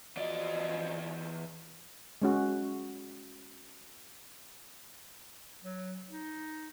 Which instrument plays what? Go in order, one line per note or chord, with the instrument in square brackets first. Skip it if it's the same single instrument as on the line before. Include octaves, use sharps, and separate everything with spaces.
[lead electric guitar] E2 D5 [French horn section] F3 F#4 D#5
[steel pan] G#3 C#4 F#4
[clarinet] F#3
D#4